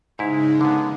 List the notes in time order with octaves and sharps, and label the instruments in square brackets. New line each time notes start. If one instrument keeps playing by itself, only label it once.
[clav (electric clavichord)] G#2 E4 [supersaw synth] C#3 G#3 [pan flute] D#4
[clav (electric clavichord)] D3 B3